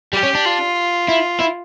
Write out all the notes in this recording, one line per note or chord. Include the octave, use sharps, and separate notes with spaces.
G3 G4
C#4
D4
F4
E4
E4